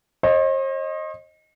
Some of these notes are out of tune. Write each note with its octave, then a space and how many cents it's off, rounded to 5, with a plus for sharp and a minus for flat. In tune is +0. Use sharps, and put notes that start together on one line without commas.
C5 +45 D#5 +0